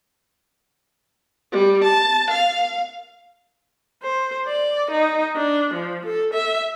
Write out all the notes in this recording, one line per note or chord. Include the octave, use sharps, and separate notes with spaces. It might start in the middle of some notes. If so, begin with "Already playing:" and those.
G3
A5
F5
C5
D5
D#4
D4
F3
A4
E5